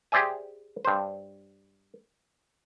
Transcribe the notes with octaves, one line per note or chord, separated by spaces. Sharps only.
G4 G#4 C5 D5 E5 G#5
G2 C5